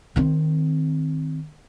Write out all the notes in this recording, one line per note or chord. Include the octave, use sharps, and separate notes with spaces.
D#3 C4